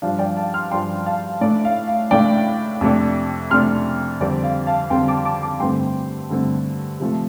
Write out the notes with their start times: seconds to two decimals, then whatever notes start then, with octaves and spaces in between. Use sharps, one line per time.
0.02 G2 F3 D4 F5
0.19 D5 G5
0.37 F5 A5
0.54 C6 F6
0.71 G2 F3 D4 G5 C6
1.06 F5 A5
1.41 A2 A3 D4 D5
1.65 F5
1.88 F5
2.11 A2 A3 D4 D5 G5
2.81 F2 C3 A3 D4
3.50 F2 C3 A3 D4 C6 F6
4.21 F2 D3 G3 C4 D5
4.44 F5
4.67 F5 A5
4.90 F2 D3 G3 C4 G5 C6
5.08 A5 D6
5.25 A5 D6
5.43 A5 D6
5.60 G2 D3 A3 C4 G5 C6
6.30 G2 D3 A3 C4
7.00 C3 F3 A3